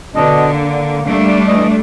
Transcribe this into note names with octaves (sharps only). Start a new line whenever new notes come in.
B2 D3 D4 D#5
A#3
G3 A3 D4
E3 D#5